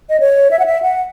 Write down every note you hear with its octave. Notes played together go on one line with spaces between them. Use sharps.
D#5
C#5
E5
F#5
E5
F#5